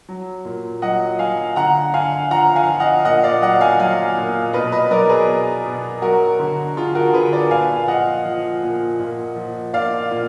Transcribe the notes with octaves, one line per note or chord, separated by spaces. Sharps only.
F#3
A#2
F#3 D#5 F#5
F#3 F5 G#5
D3 F#5 A#5
D3 F5 G#5
F3 F#5 A#5
F5 G#5
F3
D#5 F#5
A#2 D#5 F#5
D5 F5
F#3 D#5 F#5
F5 G#5
F#3 F5 G#5
A#2
B2 B4 D#5
B4 D#5
F#3 A#4 D5
G#4 B4
B2
B2
F#3 F#4 A#4
D3
D3 F4 G#4
F#4 A#4
D3 G#4 B4
A#4 D5
A#2 F5 G#5
F3 D#5 F#5
F3
A#2
A#2
F3
A#2 D5 F5
A#2